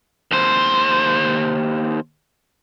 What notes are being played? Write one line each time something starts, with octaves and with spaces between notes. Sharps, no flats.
D#2 C5